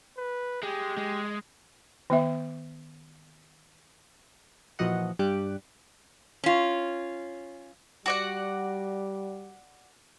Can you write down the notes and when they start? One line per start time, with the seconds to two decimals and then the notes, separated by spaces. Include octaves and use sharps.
0.17 B4
0.63 G#3 G4
0.97 G#3
2.10 D#3 B3 E5
4.79 A#2 E3 F3 F#4 D#5 F#5
5.19 G2 G3 G4 D6 F#6
6.44 C#4 F4
8.06 G3 F#4 D5 F#5